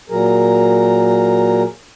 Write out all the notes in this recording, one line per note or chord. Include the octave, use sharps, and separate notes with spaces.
A#2 F#3 G#4 A#4